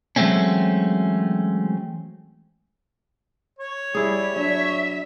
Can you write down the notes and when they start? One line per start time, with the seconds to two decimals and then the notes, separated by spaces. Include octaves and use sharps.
0.16 E3 F#3 G#3 A3 C4 C#4
3.59 C#5
3.95 G3 E4 G#4
4.36 F#3 D4 E5